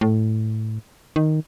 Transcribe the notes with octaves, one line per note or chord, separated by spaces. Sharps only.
A2
D#3